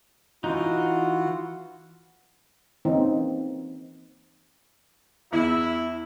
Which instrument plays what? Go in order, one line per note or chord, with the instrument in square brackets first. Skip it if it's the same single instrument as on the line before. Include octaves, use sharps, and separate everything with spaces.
[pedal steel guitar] E3 D#4 [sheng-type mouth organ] F4 F#4 F#5
[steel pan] E3 A#3 C4 C#4 D#4
[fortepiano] E2 [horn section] E4